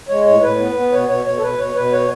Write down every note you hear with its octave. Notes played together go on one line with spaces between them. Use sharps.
G#3 C#5
A2 C#5
A2 B4
B3
B3
B2 C#5
B2 C#5
B2 C#5
A4
B2 B4
B2 C#5
B2 B4
C#5